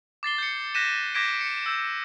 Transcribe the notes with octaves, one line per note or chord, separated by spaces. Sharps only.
D6 A6 C7 G7
G6 C#7
F#6 G6 A#6 B6 D#7 E7
D6 G6 G#6 A#6 B6 D7
C#7
E6 G6